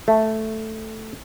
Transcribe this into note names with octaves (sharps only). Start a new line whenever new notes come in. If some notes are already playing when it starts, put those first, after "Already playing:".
A3